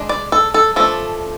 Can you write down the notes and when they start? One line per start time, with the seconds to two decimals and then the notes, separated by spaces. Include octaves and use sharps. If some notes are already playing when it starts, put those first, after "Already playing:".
Already playing: G#3 D4
0.09 D5
0.32 A4
0.54 A4
0.76 F3 A3 D4 A4